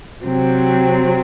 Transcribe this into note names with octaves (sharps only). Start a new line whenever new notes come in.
C3 F#3 C4